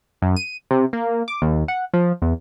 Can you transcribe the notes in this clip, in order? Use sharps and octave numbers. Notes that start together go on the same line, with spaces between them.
F#2
D#7
C3
A#3
D6
D#2
F#5
F3
E2